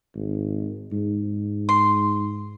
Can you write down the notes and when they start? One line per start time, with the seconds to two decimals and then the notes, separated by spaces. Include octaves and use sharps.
0.15 G#1
0.92 G#2
1.69 C6